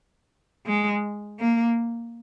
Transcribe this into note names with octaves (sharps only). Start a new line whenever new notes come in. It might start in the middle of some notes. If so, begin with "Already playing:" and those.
G#3
A#3